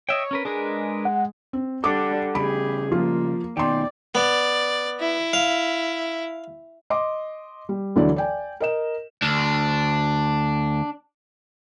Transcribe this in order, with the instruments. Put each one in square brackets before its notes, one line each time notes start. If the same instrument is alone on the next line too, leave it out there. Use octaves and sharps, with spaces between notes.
[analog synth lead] C#5 [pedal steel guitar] D#5 E5 G5
[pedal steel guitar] C#4 A#4 B4
[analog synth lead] G#3 [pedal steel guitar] D4 A#4 B4
[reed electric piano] F#5
[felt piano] C4
[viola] G3 D4 [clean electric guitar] A4 D5 F#5 [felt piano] D6
[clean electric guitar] C#3 G3 [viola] G4 G#4 [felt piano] B5
[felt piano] F3 F4 [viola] A#3
[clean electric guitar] B2 D#3 [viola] D5 [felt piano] G5 C6
[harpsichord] B3 [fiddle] D5
[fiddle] E4
[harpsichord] F5
[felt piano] D#5 C6 D6
G3
D2 D3 E3 F#3 D5
D5 G5 G#5
A#4 D#5 E7
[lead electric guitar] D2 [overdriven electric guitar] D4